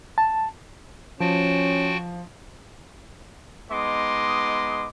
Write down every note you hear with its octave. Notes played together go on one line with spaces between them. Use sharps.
A5
F3 C#4 F#4 G5 A5
G#3 B3 D#4 D#5 C6 D6